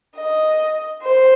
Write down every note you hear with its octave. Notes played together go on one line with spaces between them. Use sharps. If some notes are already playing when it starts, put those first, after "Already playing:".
D#5
C5